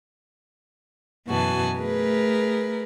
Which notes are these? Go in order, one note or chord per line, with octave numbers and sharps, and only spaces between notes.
F#2 B2 E3 F#4 G#5 A5
A3 G#4 A#4 B4